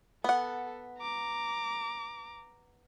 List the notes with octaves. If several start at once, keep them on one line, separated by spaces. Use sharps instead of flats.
B3 A4 F#5
A#5 D6